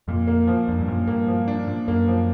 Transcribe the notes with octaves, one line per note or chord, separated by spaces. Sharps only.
F2 A#2
A#3
F3
F2 D4
G2
F#2 A#2
G2 A#3
F3
D4
A#2
F#2 A#3
F3